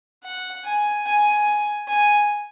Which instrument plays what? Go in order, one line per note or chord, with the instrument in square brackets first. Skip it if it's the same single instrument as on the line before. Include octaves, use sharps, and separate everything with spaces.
[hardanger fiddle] F#5
G#5
G#5
G#5